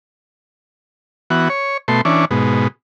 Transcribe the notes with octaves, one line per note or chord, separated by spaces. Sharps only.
E3 B3 F#4
C#5
B2 A3 C6
E3 C#4 D4
G#2 B2